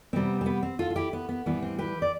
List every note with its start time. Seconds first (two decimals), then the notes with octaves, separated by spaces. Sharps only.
0.13 C3 G3 B3 C4
0.41 C4
0.46 B3
0.63 C4
0.79 F4 A4
0.90 F4
0.96 E4 G4
1.13 B3
1.29 B3
1.46 A2 E3 G3 B3
1.62 C4
1.79 G4 B4
2.02 D5